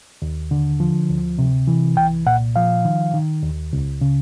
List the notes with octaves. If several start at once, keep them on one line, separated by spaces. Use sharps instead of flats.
D#2
D3
F3
D2
C3
E3
C2 G5
A#2 F#5
F3 F5
D#3
D#3
D#2
C#2
C#3